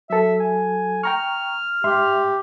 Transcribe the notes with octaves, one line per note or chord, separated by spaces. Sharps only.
F#3 A4 E5
G#5
G5 A#5 C#6 F6
G#2 G4 E5 C6